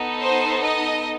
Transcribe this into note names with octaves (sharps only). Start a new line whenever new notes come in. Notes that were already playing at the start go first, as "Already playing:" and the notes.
Already playing: B3 D#4 A4
C5
D#5